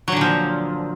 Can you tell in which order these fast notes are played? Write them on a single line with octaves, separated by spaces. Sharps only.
F#3 D3 A#2 F3